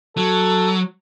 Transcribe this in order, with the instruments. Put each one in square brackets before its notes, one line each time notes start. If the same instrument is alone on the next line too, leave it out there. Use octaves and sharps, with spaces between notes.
[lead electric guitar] F#3 [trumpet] A4